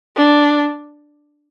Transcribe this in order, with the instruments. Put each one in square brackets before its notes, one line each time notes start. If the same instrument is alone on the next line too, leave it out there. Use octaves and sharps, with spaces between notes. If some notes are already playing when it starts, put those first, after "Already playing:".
[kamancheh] D4